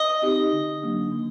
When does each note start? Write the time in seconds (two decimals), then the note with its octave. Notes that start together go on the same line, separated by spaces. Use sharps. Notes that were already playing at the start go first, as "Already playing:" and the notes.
Already playing: D#5
0.22 C4 D#4 G4
0.52 D3
0.82 F#3 A#3 D4
1.12 D3